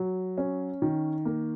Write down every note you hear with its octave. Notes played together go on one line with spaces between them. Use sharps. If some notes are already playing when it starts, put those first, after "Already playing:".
Already playing: F#3
C#4
D#3
A#3